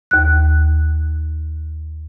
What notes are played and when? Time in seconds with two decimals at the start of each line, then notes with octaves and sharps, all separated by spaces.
0.11 D#2 F#6